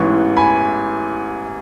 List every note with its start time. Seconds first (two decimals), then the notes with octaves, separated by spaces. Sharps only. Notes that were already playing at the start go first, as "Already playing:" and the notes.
Already playing: A1 G#2 E3 B3 C#6
0.37 G#5 B5